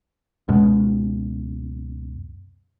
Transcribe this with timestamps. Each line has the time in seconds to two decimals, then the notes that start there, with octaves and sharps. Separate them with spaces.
0.48 C#2 F#2 B2 G#3